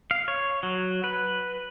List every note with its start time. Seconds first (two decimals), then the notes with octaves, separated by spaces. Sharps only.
0.11 F5
0.28 C#5
0.63 F#3
1.04 B4